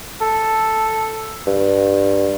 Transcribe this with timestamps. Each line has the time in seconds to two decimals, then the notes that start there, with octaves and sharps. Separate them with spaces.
0.21 A4
1.47 G2